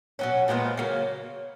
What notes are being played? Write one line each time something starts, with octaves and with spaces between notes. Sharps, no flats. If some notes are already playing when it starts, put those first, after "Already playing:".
B2 F#3 C#4
A#2 F3 G#3 B3
C#3 F#3 A#3